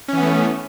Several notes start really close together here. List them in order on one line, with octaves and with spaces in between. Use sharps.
C#4 E3 B3 A3